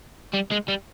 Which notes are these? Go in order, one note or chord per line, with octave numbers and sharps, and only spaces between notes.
G3
G#3
G3